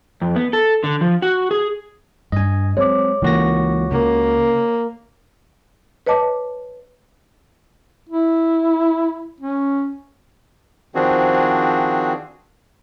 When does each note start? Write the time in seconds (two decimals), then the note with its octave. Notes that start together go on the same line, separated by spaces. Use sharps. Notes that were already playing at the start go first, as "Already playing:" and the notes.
0.22 F2
0.36 B3
0.53 A4
0.84 D3
1.01 F3
1.22 F#4
1.51 G#4
2.32 G2 D4 D#5 G#5
2.77 F#3 G#3 C4 C#5 D6
3.22 C#2 E3 A#3 F#4 A#6
3.92 C#3 A#3
6.07 B4 C#5 D#5 A5 D6
8.09 E4
9.40 C#4
10.95 D#3 F3 C4 D4 F#4 G#4